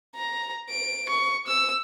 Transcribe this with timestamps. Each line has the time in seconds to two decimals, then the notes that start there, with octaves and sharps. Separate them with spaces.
0.16 A#5
0.70 D7
1.10 C#6
1.48 E6